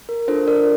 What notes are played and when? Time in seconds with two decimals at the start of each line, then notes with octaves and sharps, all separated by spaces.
0.09 A#4
0.28 D4 F4 A4 C5
0.47 A#4 D5